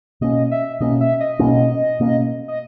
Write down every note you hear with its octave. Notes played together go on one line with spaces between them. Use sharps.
B2 A#3 C#4 D#5
E5
B2 A#3 C#4 D#5
E5
D#5
B2 A#3 C#4
B2 A#3 C#4
D#5